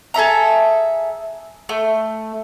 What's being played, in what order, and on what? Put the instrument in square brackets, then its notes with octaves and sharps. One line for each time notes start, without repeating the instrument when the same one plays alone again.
[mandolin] G#4 A4 E5 A#5
A3